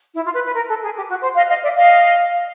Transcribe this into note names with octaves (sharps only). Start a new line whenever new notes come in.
E4
F4
B4
B4
A#4
A4
G#4
G4
F#4
C5
D#5 F5
D#5 F5
D5 E5
D#5 F5